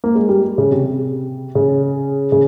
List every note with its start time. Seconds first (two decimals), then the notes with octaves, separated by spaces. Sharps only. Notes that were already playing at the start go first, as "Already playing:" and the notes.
0.04 A#3
0.15 G#3
0.29 G3
0.58 C#3
0.72 C3
1.55 C#3
2.32 C#3